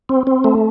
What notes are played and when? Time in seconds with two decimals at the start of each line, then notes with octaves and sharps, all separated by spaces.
0.09 C4
0.27 C4
0.44 A3